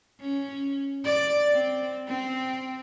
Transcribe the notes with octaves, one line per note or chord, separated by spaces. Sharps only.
C#4
D5
C4
C4